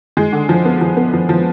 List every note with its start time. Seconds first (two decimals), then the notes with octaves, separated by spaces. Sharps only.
0.17 G#3
0.32 D3
0.49 F3
0.65 B3
0.81 F3
0.97 B3
1.13 F3
1.29 F3